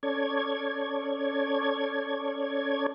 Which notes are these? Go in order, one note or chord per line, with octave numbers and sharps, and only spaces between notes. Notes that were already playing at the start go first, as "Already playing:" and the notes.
C#4 A4 C#5 D5 G#6